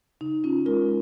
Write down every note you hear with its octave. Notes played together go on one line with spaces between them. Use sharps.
C#3 D#4
C#4 F4
G#3 F4 A#4